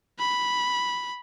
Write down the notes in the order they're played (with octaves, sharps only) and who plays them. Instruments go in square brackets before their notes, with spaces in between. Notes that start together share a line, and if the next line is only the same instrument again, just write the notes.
[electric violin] B5